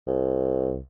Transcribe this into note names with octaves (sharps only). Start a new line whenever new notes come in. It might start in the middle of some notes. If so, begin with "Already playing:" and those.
C2